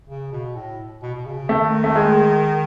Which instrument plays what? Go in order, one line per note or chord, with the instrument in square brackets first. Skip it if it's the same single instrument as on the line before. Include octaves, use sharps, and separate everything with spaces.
[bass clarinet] C#3
B2
A2
B2
B2
C#3
[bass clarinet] D#3 [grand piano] A3
[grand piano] A3
G#3